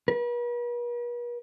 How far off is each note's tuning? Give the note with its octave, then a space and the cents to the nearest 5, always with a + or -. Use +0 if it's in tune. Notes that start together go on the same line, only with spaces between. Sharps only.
B4 -45